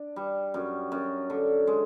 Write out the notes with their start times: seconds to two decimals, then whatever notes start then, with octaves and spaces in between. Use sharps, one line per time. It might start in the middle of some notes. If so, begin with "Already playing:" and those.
Already playing: D4
0.16 G3
0.54 F#2
0.92 F#2
1.30 D3
1.67 G#3